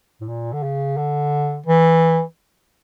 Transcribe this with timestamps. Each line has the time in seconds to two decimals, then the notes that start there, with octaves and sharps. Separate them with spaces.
0.21 A2
0.28 A#2
0.53 D3
0.63 C#3
0.97 D3
1.66 E3